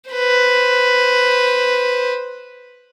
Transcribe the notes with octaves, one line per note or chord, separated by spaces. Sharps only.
B4 C5